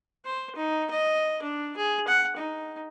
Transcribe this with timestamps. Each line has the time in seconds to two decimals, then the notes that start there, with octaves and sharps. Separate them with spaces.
0.25 C5
0.55 D#4
0.91 D#5
1.43 D4
1.77 G#4
2.08 F#5
2.37 D#4